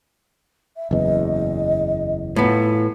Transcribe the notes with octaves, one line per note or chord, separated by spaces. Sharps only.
E5
F#1 E2 D#5
A2 B3 F4